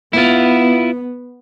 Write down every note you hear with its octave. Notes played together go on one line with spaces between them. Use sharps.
B3 E4 F4